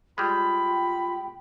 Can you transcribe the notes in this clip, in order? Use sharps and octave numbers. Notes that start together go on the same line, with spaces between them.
G3 G#3 F4 G5 B5